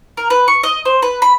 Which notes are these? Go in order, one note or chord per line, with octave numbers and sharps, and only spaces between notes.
A#4
B4
C#6
D#5
C5
B4
B5